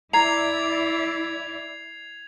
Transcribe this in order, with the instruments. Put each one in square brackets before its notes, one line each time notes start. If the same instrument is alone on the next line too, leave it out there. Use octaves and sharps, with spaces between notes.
[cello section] E4 D5 [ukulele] A#5 [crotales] G#6 C7 F7